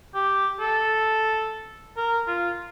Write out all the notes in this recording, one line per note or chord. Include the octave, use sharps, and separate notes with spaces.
G4
A4
A#4
F4